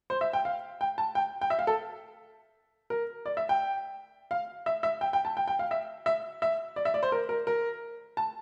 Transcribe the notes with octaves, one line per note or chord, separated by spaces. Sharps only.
C5
E5
G5
F5
G5
A5
G5
G5
E5
F5
A4
A#4
D5
E5
G5
F5
E5
E5
G5
G5
A5
G5
G5
F5
E5
E5
E5
D5
E5
D5
C5
A#4
A#4
A#4
A5